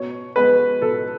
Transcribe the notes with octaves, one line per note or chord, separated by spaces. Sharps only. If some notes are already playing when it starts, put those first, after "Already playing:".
Already playing: B2 C#5
G#3 B3 B4
B2 A4